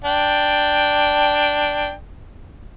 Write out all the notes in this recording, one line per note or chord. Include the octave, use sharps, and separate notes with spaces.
D4 G5